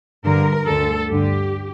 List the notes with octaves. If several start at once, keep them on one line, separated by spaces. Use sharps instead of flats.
G2 D3 A#4
D2 D3 A4
G2 D3 G4